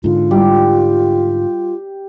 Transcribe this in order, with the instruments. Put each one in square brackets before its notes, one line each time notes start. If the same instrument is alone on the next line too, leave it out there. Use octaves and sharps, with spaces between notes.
[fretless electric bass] G#2 D3 [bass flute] F4
[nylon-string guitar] G3 [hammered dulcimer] G4